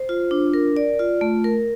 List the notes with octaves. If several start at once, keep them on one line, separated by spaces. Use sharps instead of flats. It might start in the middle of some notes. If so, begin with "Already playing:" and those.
Already playing: C5
F4
D4
A#4
D5
F4
A3
A#4